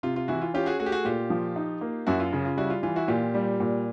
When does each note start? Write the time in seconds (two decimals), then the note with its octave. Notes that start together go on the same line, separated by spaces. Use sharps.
0.03 C3 F4
0.16 F4
0.28 E3 E4 F#4
0.41 F4
0.54 C#4 F4 G4
0.66 F#4 G#4
0.79 A3 F#4 G#4
0.86 G4
0.92 F#4 G#4
1.05 A#2 F4 G4
1.30 F3
1.56 D#4
1.81 A#3
2.07 F#2 E4 F#4
2.20 F4
2.33 C#3
2.45 F4
2.57 G3 E4 F#4
2.70 F4
2.83 E3 F4
2.96 E4 F#4
3.08 A#2 F4 G4
3.34 G3
3.60 A#2